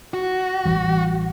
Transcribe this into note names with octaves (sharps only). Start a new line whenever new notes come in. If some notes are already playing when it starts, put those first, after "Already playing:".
F#4
A1 E3 G3